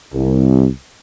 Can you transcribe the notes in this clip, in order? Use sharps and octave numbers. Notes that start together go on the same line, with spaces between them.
C2